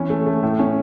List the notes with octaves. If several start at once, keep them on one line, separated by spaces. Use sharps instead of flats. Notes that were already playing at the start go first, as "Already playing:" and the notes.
Already playing: E3 C#4
A3
A3
A2
C#4